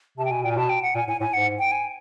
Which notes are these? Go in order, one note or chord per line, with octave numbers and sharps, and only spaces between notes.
C3 A5
G5
B2 G#5
A#2 G5
G#5
B2 A5
G5
F#5
A#2 G#5
A2 G#5
A2 G#5
G#2 F#5
G5
G#5